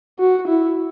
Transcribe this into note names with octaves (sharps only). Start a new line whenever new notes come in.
F#4
E4